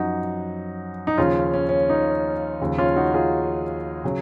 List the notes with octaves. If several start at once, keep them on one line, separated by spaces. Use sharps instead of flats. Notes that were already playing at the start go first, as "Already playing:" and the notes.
Already playing: F#2 F3 D#4 F#4
D#4
D#2 C#3 F3 C#4 F4
C#4
C#4
D#4
D#2 C#3 F3
C#4 F4
D#4 F#4
F4 G#4
C#3 F#3